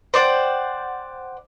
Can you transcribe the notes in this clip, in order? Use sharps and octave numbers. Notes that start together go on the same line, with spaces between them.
C5 D5 F#5 G5